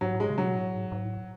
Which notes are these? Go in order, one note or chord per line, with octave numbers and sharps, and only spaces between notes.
G#2 F#3
A2
G#3
C#3
B2 F#3
A2
G#2
G#2
A2